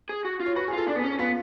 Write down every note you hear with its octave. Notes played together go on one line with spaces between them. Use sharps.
G#4
F#4
F4
C#5
F#4 B4
G#4
F4 A4
D4
B3
G#4
C#4
B3 F4